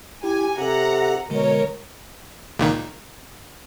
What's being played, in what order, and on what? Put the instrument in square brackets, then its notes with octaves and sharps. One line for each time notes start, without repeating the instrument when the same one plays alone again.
[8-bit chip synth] E4 [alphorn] G4 [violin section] G#5
[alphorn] C3 [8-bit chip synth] G4 A4 [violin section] F#5 A#5
[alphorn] B2 [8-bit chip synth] D3 G#3 [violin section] A#4 C#5
[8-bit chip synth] C#2 A#2 D#3